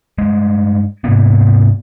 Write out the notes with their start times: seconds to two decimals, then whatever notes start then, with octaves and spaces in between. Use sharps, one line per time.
0.18 G2 G#3
1.04 G#2 C3 A#3 B3